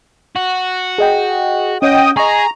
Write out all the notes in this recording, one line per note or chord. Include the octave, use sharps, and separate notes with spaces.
F#4
G#4 D#5 G5
C#4 C#5 D#5 F#5 G5 D#6
G#4 D#5 A#5 C#6